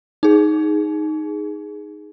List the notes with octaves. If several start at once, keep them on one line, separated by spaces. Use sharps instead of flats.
D#4 G#4